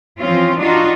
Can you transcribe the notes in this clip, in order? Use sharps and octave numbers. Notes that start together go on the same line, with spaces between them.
E3 F3 C4 C#4 F4
D4 D#4 F4 F#4